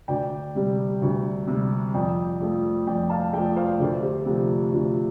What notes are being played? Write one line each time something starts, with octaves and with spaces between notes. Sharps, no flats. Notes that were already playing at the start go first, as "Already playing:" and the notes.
D2 D5 G5
C3 G3
D2
C3 G3
F2 D5 G5
F3 A3
F2 D5 G5
F5 A5
F3 A3 D5 G5
C5 F5
D2 A4 D5
G4 C5
C3 F3 A3 G4
G4
D2 F4